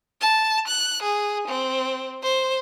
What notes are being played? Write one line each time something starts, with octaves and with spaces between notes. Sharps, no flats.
A5
F#6
G#4
C4
C5